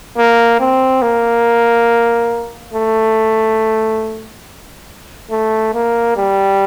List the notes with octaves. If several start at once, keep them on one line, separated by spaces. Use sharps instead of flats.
A#3
C4
A#3
A3
A3
A#3
G3